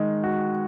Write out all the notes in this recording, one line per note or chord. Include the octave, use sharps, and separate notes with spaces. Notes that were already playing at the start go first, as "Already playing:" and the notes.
Already playing: D#3 G#3
F#4